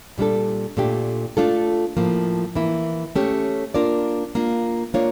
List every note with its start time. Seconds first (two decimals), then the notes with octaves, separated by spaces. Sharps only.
0.18 A#2 G3 D4 A4
0.77 A#2 A3 D4 G4
1.37 A3 D4 F4 A4
1.97 A2 F3 A#3
2.55 E3 A#3 E4
3.15 A3 C#4 G4 C#5
3.74 A#3 D4 F4 A#4 D5
4.35 A#3 D4 F4
4.94 A#3 D4 F4 C#5